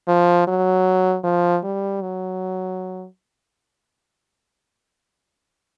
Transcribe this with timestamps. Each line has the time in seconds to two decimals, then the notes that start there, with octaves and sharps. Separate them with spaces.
0.08 F3
0.47 F#3
1.24 F3
1.64 G3
2.01 F#3